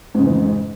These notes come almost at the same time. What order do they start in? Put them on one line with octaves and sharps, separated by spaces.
G#2 C#3 F2 E3